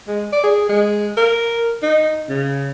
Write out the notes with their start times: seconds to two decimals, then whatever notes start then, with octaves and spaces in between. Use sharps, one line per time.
0.08 G#3
0.33 D5
0.44 G#4
0.69 G#3
1.17 A#4
1.82 D#4
2.29 C#3